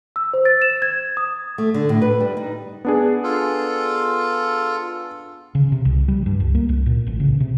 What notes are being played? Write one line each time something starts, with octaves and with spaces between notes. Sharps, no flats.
E6
C5
A6
E7
G#6
D#6
A3
D3
A2
B4
G3
D#4
B3 D4 G#4
F4 A4
C#3
C3
C2
G3
G2
C#2
A#3
C2
A#2
A1
C#3
C3